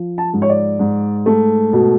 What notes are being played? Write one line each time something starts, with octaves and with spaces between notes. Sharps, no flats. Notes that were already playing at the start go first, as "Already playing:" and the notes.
Already playing: F3
A5
G#2
C#5
D5
G#2
A3
B2